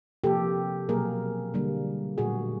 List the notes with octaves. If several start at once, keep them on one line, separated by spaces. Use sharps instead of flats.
C3 F3 A#3 G4 A4
B2 F#3 A#3 G#4 A#4
D3 G3 A#3
A#2 F#3 A3 F#4 G#4